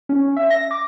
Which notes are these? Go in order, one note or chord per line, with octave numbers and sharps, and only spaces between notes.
C#4
E5
A#6
D6